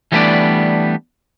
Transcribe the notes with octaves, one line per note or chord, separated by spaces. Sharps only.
E3 G3 A3 B3 D4 D5